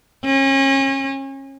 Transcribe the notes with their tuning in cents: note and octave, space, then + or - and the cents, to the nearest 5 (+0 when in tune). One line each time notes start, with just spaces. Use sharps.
C#4 -35